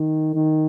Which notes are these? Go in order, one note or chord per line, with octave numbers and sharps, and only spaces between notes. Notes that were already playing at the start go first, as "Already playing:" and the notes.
Already playing: D#3
D#3